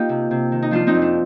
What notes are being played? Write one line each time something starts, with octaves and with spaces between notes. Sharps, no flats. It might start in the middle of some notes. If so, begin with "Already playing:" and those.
Already playing: A#3 D#4 F4 G4
C3
C3
D#3
D#4
F3 D4 F4
C4 D#4
F2
D4